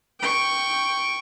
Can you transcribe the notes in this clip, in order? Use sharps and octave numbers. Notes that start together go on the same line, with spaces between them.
G5 C#6